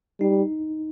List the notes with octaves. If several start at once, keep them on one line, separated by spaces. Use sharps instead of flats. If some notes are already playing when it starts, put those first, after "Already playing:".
G3 D#4